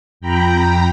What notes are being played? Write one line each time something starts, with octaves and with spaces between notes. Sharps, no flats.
F2 G5 A#5 B5